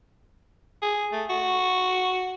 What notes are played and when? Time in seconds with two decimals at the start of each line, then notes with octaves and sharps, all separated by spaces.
0.82 G#4
1.13 A3
1.30 F#4